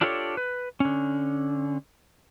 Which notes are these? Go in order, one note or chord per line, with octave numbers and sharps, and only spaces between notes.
D4 F4 G4 A4 B4 C#5
B4
D3 C#4